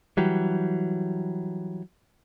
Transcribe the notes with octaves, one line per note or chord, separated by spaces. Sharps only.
E3 F#3 G3